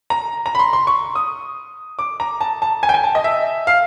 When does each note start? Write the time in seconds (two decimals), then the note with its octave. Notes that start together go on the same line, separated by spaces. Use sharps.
0.10 A#5
0.46 A#5
0.55 B5
0.59 C6
0.73 C6
0.87 C#6
1.15 D#6
1.99 D6
2.20 A#5
2.41 A5
2.62 A5
2.83 G#5
2.89 G5
2.94 G#5
3.04 A5
3.15 D#5
3.24 E5
3.67 F5